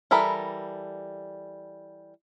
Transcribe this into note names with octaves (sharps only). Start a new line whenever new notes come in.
E3 G3 A4 A#4 B5